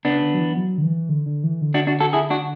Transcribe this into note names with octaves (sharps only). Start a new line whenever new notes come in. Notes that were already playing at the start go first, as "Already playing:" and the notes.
C#3 B3 D4
C#3
D3
F#3
E3
F#3
D3
E3
D3
D3
E3
D3
D4 F#4
D4 F#4
F#4 A4
E4 G#4
D4 F#4